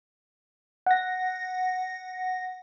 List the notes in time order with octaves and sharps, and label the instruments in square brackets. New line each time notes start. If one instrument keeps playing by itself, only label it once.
[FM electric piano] F#5 A#6